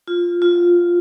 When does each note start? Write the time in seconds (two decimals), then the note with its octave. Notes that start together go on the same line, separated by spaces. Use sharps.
0.08 F4
0.42 F4